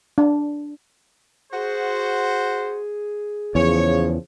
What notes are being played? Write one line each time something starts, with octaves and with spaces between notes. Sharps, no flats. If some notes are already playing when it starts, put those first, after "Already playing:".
D4
F#4 G#4 C5
E2 C#3 F3 C#5